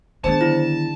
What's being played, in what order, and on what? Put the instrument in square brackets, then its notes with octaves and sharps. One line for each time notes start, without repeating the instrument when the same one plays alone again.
[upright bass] D#3 B3 [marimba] D4 G#4 [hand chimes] C5 [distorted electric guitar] A5
[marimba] D3 F#3 [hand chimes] E4